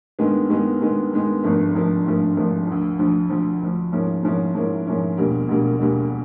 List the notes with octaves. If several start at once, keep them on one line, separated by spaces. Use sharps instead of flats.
G2 D#3 G#3 B3
G2 D#3 G#3 B3
G2 D#3 G#3 B3
G2 D#3 G#3 B3
G#1 G2 D3 F3 A3
G#1 G2 D3 F3 A3
G#1 G2 D3 F3 A3
G#1 G2 D3 F3 A3
D2 D3 F3
D2 D3 F3
D2 D3 F3
D2 D3 F3
G#2 F3 A#3 C#4 E4
G#2 F3 A#3 C#4 E4
G#2 F3 A#3 C#4 E4
G#2 F3 A#3 C#4 E4
E1 D2 D3 G3 A#3
E1 D2 D3 G3 A#3
E1 D2 D3 G3 A#3